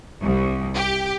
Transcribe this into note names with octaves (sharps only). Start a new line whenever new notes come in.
C2
G4